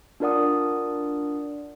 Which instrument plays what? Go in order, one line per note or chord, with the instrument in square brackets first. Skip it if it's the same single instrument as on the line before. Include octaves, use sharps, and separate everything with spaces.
[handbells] D4 F4 A#4 D5 F#5 D#6